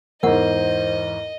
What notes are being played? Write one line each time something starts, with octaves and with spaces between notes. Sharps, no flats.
E2 G#2 A#4 C5 D#5 F#5